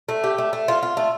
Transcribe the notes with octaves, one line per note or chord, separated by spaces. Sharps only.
A3
G4
A3
A3
F4
F4
A3